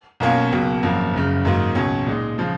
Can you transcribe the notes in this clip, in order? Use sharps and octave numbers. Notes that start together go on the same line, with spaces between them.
B1 B2 A#3 C#4 F4
C#2 B2 F#3 A#3
G#1 F#2 F3 A#3
F#1 F#2 C#3
G#2 D#3 F#3 A#3 D#4
C#2 B2 F#3 C#4
A#2 G#3 D#4
C#3 F3 G#3